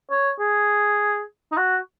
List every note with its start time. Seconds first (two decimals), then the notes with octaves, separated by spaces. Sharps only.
0.11 C#5
0.40 G#4
1.52 D#4
1.57 F#4